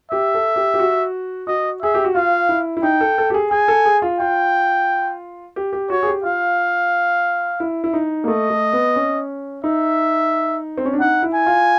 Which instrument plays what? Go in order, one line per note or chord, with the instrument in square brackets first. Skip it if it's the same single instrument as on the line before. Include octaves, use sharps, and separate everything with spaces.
[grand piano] G4 [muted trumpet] E5
[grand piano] A4
G4
G4
F#4
[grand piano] F#4 [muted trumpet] D#5
[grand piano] G#4 [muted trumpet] E5
[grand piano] G4
F#4
[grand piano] F4 [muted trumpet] F5
[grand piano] E4
E4
[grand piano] D#4 [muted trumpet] G5
[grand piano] A4
A4
G4
G#4
[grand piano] G#4 [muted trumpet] G#5
[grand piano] A4
G#4
F4
[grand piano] F4 [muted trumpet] G5
[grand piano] G4
G4
[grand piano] F#4 [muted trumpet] C#5
[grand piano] G#4
G4
[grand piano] F4 [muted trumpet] F5
[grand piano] E4
E4
D#4
A#3
[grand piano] A3 [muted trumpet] D#5
[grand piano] A3
B3
C#4
[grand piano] D#4 [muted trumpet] E5
[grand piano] C4
C#4
D4
[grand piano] D#4 [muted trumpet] F#5
[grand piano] E4
[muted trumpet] G#5
[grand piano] F4